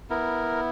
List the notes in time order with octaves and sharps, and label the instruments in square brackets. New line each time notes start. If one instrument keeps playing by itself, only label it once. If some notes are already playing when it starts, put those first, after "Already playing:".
[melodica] B3 E4 A#4